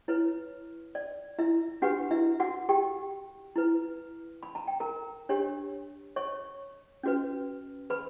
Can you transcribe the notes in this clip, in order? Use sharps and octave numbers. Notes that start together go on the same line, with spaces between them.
E4 B4 C#5
D5
E4 E5
D4 F#4 G4 B4 F#5
E4 E5
F#4 F#5
G4 G5
E4 B4
B5
A#5
G5
A#4 A#5
D4 G4 C#5
C#5 C#6
C#4 F#4 B4
B4 B5